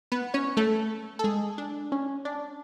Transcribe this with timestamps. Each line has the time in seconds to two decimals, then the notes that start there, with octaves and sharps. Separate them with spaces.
0.12 B3 B4
0.34 C#4 C#5
0.57 A3 A4
1.19 A4
1.24 G#3 G#4
1.58 D4
1.92 C#4
2.25 D4